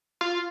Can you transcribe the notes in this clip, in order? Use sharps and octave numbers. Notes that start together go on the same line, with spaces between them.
F4